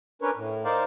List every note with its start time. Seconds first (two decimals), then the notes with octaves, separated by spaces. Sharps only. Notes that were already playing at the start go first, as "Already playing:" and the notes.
0.22 C#4 D4 A#4 B4 C#5
0.36 A2
0.65 D#4 A#4 C5 D5 F5